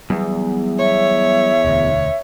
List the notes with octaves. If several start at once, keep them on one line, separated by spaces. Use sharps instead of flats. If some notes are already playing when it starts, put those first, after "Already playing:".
E2 F#3 G3 B3
C#5 E5
E1 D2